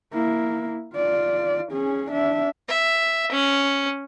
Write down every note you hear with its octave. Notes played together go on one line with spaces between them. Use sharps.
A#3 E4
F4 D5
C#4 G#4
D4 E5
E5
C#4